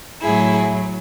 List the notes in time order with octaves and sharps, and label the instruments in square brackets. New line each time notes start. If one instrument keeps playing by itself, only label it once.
[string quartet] A2 F#3 E4 G#4